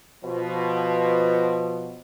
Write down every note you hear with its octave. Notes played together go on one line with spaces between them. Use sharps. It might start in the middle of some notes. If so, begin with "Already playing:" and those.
B2 F3